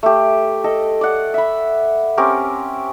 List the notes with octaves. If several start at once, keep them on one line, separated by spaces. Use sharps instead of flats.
A3 G4
A4 D#5
D5 F#5
E5 B5
C4 C#4 G4 A#4